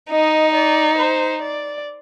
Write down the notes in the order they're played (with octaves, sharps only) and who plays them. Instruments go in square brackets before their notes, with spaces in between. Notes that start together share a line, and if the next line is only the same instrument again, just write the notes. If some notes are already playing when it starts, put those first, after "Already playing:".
[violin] D#4 [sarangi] D#5
[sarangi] D5
C5
D5